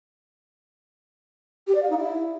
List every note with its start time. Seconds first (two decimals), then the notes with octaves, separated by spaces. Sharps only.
1.67 G4
1.75 D5
1.82 F5
1.90 D#4
1.98 E4